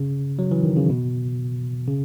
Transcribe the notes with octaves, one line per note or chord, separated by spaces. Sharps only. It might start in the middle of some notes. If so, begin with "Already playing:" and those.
Already playing: C#3
F#3
E3
D#3
C#3
B2
C#3